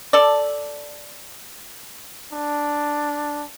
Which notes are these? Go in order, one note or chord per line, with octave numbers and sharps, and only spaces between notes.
A4 D5
D4